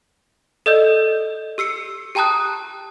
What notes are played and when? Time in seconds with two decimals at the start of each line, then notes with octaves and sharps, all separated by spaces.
0.66 A4 D5 D#5 E6 G6
1.58 G4 E6 C7 C#7
2.15 G4 G5 A5 A#5 D#6 F#6